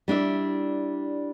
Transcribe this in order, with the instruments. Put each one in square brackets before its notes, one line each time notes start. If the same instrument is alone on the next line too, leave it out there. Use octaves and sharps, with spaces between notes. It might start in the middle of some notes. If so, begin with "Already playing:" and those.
[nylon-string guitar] G3 D4 E4 E5